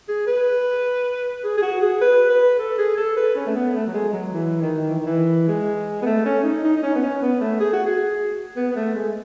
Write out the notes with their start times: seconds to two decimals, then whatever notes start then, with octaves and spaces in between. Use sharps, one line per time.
0.08 G#4
0.27 B4
1.44 G#4
1.57 G#4
1.62 F#4
1.81 G#4
2.01 B4
2.30 B4
2.59 A4
2.78 G#4
2.97 A4
3.17 B4
3.36 C#4
3.47 A3
3.55 B3
3.75 A3
3.87 F#3
3.94 G#3
4.13 F#3
4.33 E3
4.62 D#3
4.90 E3
4.98 D#3
5.06 E3
5.48 G#3
6.02 B3
6.06 A3
6.25 C#4
6.44 D#4
6.64 D#4
6.77 D#4
6.83 C#4
6.95 B3
7.02 C#4
7.21 B3
7.41 A3
7.60 G#4
7.73 F#4
7.86 G#4
8.56 B3
8.71 B3
8.76 A3
8.95 G#3